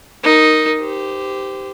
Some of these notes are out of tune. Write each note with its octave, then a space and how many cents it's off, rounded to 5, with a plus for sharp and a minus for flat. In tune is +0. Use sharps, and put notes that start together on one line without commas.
D#4 +0 A#4 +0
G4 +0 C5 -30